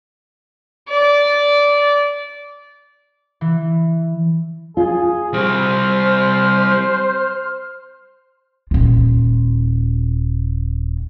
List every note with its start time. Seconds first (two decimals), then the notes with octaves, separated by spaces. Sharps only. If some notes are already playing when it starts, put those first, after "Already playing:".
0.89 D5
3.41 E3
4.77 F4 G#4
5.34 G3 C4 C5 F6
8.71 D#1 F4